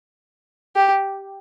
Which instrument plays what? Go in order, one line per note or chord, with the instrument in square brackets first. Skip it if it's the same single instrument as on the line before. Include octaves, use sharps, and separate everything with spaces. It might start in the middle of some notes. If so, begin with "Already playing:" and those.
[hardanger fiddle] G4